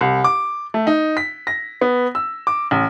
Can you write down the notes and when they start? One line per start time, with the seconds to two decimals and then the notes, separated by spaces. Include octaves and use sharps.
0.01 C2
0.24 D6
0.74 A3
0.87 D#4
1.17 B6
1.47 A#6
1.81 B3
2.15 E6
2.47 D6
2.71 A1